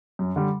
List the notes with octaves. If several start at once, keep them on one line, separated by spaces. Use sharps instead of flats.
F#2
D3 G3